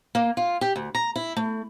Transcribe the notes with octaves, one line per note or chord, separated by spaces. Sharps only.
A#3
F4
G4
D2
A#5
E4
A3